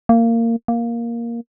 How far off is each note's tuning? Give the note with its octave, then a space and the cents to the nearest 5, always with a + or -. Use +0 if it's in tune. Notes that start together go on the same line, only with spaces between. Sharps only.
A#3 -20
A#3 +5